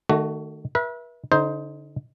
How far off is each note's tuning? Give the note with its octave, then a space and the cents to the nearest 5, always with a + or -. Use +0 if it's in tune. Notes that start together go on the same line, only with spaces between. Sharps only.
D#3 -30 A3 +5 F#4 +20
B4 -40 E5 +0
D3 -25 D#4 +20 C5 +0